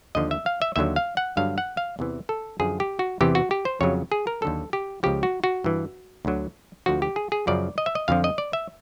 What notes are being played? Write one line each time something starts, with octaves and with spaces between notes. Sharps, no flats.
D#2 D3 F3 D#5
E5
F5
E5
D#2 D3 F#3 E5
F5
F#5
G2 D3 F#3 F5
F#5
F5
E2 C3 E3
A4
F#2 D3 F3 G#4
G4
F#4
E2 C3 E3 G4
F#4
G4
C5
F2 C#3 F#3 C#5
G#4
A#4
D#2 D3 F#3 A4
G4
C#2 C#3 F3 G4
F#4
F#4
G2 E3
D2 D3 F#3
D2 D3 F3 F#4
G4
G#4
G#4
F#2 C#3 F3 D5
D#5
E5
D#5
F2 D3 F3 F5
D#5
D5
E5